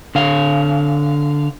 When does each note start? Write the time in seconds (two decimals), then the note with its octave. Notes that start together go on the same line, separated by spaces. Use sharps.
0.15 D3 F5